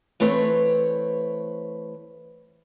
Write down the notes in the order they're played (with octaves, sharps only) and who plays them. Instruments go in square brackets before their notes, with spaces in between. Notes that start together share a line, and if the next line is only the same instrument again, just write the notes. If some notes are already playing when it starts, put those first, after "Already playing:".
[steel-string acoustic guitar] E3 A3 C4 B4 C#5